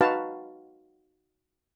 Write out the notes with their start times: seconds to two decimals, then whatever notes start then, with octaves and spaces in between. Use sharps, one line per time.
0.01 D#4 F#4 B4 F5 A5